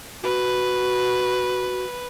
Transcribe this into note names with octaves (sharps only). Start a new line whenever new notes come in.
F#4 B4